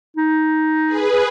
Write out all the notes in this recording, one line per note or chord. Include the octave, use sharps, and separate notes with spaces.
D#4
G#4 B4